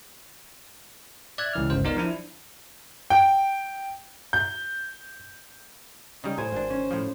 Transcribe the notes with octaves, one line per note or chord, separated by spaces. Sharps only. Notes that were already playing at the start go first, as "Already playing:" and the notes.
D5 E5 F#6 G#6
C#2 E3 F6
G1 C#2 C5
B3 D#4 F4 A#4 D5 F5
F3 D4 E4
G5
G6
C#3 G3 D#4
A2 C5 G#5
G#1 D4
C#4
A2 F3